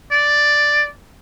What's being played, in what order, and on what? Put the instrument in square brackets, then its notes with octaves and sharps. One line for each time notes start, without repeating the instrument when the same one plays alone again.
[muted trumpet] D5